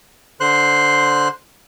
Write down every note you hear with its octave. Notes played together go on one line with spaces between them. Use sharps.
D3 C5 C6 F#6